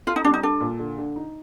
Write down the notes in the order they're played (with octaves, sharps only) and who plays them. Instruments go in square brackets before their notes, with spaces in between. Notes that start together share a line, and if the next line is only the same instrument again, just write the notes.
[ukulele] F4 [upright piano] A4
[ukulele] D#4
[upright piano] G3 [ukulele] D4
[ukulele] D#4
[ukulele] D4 [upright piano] A4
[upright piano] A#2
D3
D3
D#4